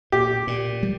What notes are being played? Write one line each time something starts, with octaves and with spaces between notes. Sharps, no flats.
A#2 G4
A#2
G3